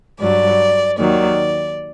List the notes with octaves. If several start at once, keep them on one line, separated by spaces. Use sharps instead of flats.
G2 F#3 D5
D#2 D#3 F#3 D5